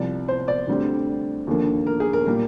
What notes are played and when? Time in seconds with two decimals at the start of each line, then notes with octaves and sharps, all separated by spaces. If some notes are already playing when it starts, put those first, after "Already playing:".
Already playing: C2 C3 F3 D5
0.28 C5
0.48 D5
0.67 D2 D3 G3 C4
1.47 D#2 D3 F3 A#3
1.87 A#4
2.00 G#4
2.13 A#4
2.26 A#2 G3 A#3